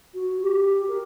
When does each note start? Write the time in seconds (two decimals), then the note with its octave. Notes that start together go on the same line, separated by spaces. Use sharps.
0.14 F#4
0.41 G4
0.88 A#4